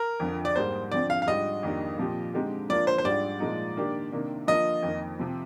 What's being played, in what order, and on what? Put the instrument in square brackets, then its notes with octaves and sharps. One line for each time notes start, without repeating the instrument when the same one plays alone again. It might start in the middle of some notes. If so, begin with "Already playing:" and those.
Already playing: [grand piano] A#4
[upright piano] F2 D3 F3
[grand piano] D5
[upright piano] G#2 G3 A#3 [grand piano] C5
[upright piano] D3 F3 C4 [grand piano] D5
[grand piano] F5
F5
[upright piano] G#2 G3 D4 F4 [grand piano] D#5
[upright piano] F2 D#3 A#3 D4 G4
A#2 F3 C4 G4
D3 G#3 C4 D#4 G4
[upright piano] F3 A#3 D4 F4 [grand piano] D5
[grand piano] C5
C5
[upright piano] G#2 G3 D4 F4 [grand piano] D5
[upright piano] A#2 F3 G#3 D#4
D#3 A#3 D4 G4
C3 D#3 A#3 D4
[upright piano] D3 F3 A#3 F4 [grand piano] D#5
[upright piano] F2 D#3 A#3
C3 F3 C4